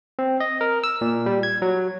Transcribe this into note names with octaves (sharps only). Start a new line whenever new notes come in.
C4
D#5
A#4
E6
A#2
G3
G#6
F#3